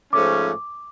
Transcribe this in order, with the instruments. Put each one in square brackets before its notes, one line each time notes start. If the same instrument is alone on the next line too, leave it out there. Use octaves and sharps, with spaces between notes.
[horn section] G#2 F3 A3 C#4 [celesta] D6